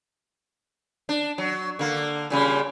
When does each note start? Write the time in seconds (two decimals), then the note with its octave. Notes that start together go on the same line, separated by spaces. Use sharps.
1.09 D4
1.38 F#3
1.79 D3 A#3
2.30 A#2 C#3 G3